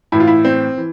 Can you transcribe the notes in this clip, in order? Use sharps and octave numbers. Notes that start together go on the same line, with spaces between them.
A2 E3 E4
F4
E4
C4
E3